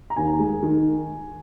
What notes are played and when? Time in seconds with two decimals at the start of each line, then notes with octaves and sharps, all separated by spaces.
0.10 A#5
0.16 D#2 G#5
0.39 G#3
0.63 D#3